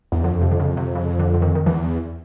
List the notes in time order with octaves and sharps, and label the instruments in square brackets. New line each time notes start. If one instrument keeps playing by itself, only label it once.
[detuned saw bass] E2
[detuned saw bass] F2 [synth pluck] D3
[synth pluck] C3
D3
C#3
C3
C#3
D3
D3
D#3
D#3
[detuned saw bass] E2 [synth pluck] E3